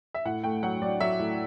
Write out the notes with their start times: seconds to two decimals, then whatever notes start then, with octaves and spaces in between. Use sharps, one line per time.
0.14 E5
0.25 A2 F#5
0.44 A3 G5
0.63 F#3 F#5
0.82 F#3 D5
1.00 F#3 E5
1.19 A2